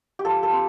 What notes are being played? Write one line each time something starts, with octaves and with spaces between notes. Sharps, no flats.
G4
F3 A4
A4
C4